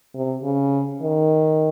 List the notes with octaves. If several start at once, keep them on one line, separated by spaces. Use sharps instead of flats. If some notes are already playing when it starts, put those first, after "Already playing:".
C3
C#3
D#3